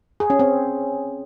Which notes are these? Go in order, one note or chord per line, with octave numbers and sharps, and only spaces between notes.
G#4
C#4
C4